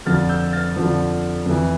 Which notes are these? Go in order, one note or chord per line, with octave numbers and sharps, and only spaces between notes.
F2 D3 F3 F6 A6
E6 G6
F6 A6
F2 D3 F3
F2 E3